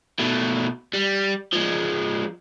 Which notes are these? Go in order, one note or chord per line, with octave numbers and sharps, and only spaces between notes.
B2 A3
G3
F3 G#3